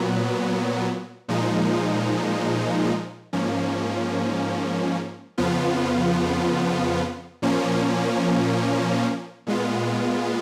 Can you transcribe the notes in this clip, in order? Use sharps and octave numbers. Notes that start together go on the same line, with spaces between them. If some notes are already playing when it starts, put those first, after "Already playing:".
Already playing: A#2 F#3 B3
A#2 F3 G#3 D#4
G#2 F3 A#3 C#4
F2 C#3 F3 B3 F4
A#2 F3 A#3 C#4
A#2 G#3 B3 F4